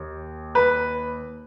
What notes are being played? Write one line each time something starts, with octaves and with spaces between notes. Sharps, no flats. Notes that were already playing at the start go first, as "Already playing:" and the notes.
Already playing: D#2
B4